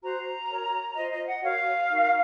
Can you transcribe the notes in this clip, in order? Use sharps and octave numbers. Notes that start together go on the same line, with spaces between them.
F#4 C5 A#5
F#4 A#4 C#5
F4 C5 D#5
D#5
F#5
F#4 A#4 C#5 F5
D#4 F#4 A#4